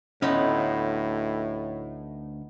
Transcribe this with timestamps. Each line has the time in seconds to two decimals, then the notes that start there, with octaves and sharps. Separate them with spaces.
0.22 D2 A2 B3 C#4 D#4 B5